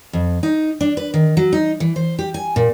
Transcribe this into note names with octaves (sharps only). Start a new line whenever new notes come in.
F2
D#4
D4
B4
D#3
F#3
D#4
E3
C5
G4
G#5
A#2